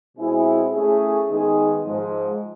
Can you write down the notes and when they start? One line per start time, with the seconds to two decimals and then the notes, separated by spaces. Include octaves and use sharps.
0.16 B2 G#3 C4 E4 G#4
0.72 A3 C#4 E4 G#4
1.28 D#3 G#3 B3 D#4 G#4
1.84 G#2 F3 G#3